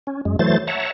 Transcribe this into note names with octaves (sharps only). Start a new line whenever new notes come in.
C#4
F#2 G#3
E3 F#3 A3 C5 A6
C#5 E5 F#5 A5 A#5